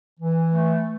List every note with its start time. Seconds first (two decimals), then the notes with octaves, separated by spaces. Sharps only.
0.20 E3
0.53 A3